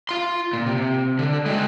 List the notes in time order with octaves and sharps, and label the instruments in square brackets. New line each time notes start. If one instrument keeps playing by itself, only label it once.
[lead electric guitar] F4 C6
A#2
C3
D3
G#3 F#4